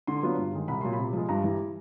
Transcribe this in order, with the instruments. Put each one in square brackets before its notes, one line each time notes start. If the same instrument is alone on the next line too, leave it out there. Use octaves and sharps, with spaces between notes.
[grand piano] D3 C6
F#3 B3 D4 F4
G2
D#3 G#3
C2 B5
A#2 F#3 C6
B5
C3
F3 G#3
G2 A#5
E3 G3